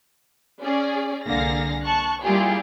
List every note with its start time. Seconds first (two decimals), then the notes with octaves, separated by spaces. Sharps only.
0.63 C#4 G#4 D5
1.26 C2 D3 A#3 G#4 F5 A#6
1.85 A5 C#6 F#6
2.23 G3 A#3 E4 F4 G4 G#4